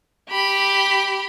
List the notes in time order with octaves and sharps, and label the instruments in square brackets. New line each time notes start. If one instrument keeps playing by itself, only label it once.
[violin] G4 B5